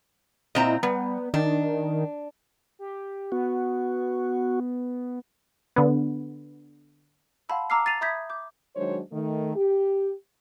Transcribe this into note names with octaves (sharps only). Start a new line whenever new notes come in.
A#2 C4 E4 D#5 A#5
G3 B3
D#3 D4
G4
B3 F#4
D3 B3
F5 F#5 A5 B5 C6 E6
A5 A#5 D6 E6 F6 C7
A6 C7 D#7 F7
E5 B5 D#6 G6 G#6 B6
D6 G6
D#3 F#3 G#3 D4 C5 C#5
D#3 A3
G4